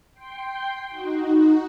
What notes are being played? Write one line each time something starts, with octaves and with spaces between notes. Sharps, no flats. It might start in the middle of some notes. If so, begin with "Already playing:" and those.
G5 C6
D#4 F#4